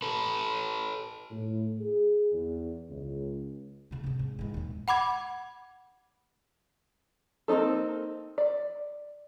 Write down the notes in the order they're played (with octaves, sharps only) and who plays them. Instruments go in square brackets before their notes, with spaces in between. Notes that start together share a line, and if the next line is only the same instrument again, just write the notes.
[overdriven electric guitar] A4 B4
[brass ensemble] A2
G#4
E2
C#2
[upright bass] C#3 E3
G#2 C3
G#2
G#2 E3
D#2 A#2
[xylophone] F#5 B5 D6 G#6
[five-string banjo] A#3 C4 C#4 D#4 A4
D5